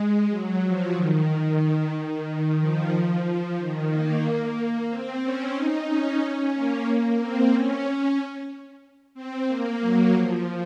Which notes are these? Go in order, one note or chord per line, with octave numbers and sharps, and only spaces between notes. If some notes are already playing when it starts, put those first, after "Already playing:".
Already playing: G#3
F#3
F3
D#3
D#3
F3
D#3
A#3
A#3
C4
C#4
D#4
C#4
A#3
C4
C#4
C4
A#3
F#3
F3